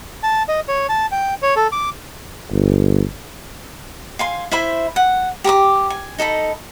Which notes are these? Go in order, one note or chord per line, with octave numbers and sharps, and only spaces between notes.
A5
D#5
C#5
A5
G5
C#5
A4
D6
G1
F5 G#5 C6
E4 C5 E5 B5
F#5
G4 A#5 C#6 D6
G#5
D#4 A4 D#5 B5